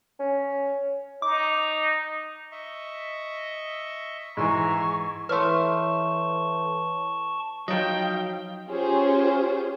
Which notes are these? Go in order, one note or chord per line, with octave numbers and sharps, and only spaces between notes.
C#4
D#4 D6
D#5 E5 C#6
G#2 E3 A#5 C6 C#6 E6
E3 A3 B4 C#5 A5 C6 C#6 F6
F3 F#3 D#4 D#5 F5 G5
C#4 F4 G4 G#4 C5 C#5